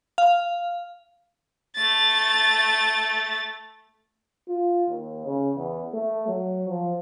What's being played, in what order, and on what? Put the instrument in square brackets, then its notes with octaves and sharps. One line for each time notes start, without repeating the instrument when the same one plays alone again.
[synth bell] F5
[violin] A3 A6
[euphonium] F4
D#2
C#3
E2
A3
F#3
F3